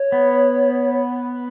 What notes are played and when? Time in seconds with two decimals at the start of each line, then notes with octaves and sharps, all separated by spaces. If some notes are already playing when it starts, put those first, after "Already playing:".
Already playing: C#5
0.12 B3